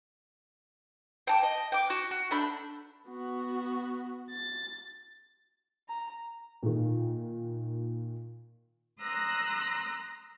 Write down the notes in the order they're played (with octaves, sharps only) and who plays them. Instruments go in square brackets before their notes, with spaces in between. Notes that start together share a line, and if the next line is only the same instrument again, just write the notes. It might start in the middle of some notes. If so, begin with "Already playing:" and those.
[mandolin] G5 A5 D6
D#5
G5 D6
F#4
F#4
A3 D4 B5 G6
[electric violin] B3 F#4
A6
[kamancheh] A#5
[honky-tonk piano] A#2 D#3
[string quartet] A#5 C6 D#6 E6 F#6 A#6